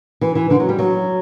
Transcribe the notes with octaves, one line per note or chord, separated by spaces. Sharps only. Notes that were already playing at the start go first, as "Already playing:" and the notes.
E3
E3
D3
F#3
G3
F#3